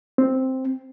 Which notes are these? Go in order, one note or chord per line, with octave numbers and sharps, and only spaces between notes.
C4